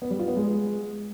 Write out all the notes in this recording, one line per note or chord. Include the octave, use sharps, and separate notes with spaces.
B3
G3
F4
B3
G#3